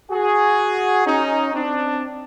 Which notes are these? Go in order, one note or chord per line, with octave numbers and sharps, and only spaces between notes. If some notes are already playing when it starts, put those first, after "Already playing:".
F#4 G#4
C#4 D#4
C4 D4